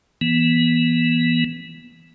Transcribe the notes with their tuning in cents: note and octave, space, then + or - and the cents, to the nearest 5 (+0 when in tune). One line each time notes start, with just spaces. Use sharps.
E3 +0 B3 -35